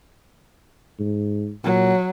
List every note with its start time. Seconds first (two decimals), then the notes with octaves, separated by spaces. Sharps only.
0.99 G#2
1.64 A#2 F#3